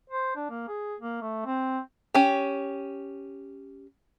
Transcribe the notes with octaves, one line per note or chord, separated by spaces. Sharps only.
C5
D4
A#3
G#4
A#3
A3
C4
C#4 G4